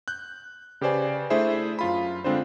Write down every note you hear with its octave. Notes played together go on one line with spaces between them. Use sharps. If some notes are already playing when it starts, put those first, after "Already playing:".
F#6 G6
C#3 G4 B4 C5 D5 G#5
A3 D4 E4 G#4 C5 E5
F#2 F4 B5
D3 G#3 C4 D4 F4 C5